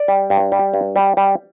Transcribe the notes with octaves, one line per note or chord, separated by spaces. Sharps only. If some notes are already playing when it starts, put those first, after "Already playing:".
Already playing: D5
G3
G2
G3
G2
G3
G3